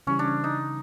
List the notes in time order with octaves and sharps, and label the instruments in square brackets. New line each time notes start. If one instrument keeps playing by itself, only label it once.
[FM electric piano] C#3 E3 G3 [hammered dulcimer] C#4
[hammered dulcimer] D4
D#4